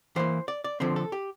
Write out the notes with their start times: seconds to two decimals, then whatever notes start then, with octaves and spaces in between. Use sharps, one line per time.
0.16 E3 A#3 C5
0.48 D5
0.64 D5
0.80 D3 F3 C4 C5
0.96 A4
1.12 G4